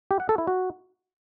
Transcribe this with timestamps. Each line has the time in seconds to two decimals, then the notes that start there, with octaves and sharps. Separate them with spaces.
0.11 G4
0.20 F#5
0.29 A4
0.38 E4
0.47 F#4